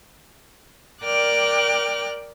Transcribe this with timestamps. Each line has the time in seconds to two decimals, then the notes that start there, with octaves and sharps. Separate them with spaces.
1.03 A#4 D5 G5 D6 F6 F#6